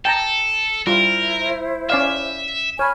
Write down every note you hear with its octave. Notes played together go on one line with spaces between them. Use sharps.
A4 G5 A5 A#5
G3 E4 F4 A#4 C5
C#4 D5 E5 F5
C#5 G#5 B5 F6